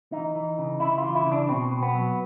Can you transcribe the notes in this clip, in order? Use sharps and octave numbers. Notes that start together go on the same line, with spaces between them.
E3 D#4
E3
C#3
C#3 E4
E3 F4
E4
C#3
D4
B2 C4
B2
B3
F#3